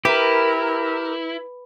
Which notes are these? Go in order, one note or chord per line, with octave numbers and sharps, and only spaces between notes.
E4 G4 A#4 B4